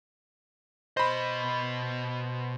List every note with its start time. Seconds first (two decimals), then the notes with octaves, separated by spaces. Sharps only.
0.97 B2 C5 D#5 B5